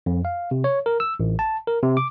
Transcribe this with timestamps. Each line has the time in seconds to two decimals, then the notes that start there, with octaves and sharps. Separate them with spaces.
0.06 F2
0.25 F5
0.51 C3
0.64 C#5
0.86 A#4
1.00 E6
1.20 A1
1.39 A5
1.67 A#4
1.83 C3
1.97 D6